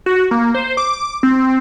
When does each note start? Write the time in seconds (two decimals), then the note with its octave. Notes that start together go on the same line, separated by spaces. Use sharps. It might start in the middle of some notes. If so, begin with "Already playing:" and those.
0.06 F#4
0.31 A#3
0.55 C5
0.77 D6
1.23 C4